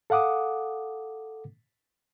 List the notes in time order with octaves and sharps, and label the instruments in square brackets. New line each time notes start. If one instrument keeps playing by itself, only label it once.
[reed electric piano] A4 F5 F#5 D6 D#6